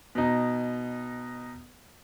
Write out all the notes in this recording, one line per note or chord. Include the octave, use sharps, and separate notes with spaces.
B2 D#4